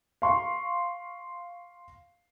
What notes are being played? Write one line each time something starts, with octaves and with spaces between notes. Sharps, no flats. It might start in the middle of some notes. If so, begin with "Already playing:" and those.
F5 C6 C#6